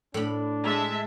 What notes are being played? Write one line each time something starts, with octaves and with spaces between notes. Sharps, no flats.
A2 D4 B5
G#3 E5 A5